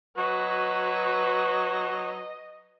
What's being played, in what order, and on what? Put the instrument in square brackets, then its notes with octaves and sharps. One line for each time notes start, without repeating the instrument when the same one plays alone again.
[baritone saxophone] F#3 [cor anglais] F#4 [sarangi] B4 [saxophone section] D#5